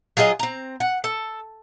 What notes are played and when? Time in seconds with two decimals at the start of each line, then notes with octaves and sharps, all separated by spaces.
0.17 F#3 F4 G#4 D#5
0.39 C4 A#5
0.80 F#5
1.04 A4